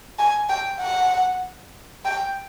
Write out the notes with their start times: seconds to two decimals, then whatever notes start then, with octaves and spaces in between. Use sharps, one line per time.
0.19 G#5
0.49 G5
0.80 F#5
2.05 G5